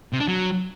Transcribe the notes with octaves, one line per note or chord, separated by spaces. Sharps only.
C3
D4
F#3